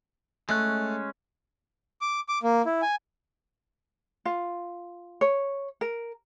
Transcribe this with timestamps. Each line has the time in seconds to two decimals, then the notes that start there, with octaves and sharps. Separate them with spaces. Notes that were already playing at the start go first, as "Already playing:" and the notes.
0.49 G#3 A3 C#4 F#6
2.01 D6
2.28 D6
2.43 A#3
2.65 E4
2.82 G#5
4.25 F4
5.21 C#5
5.81 A#4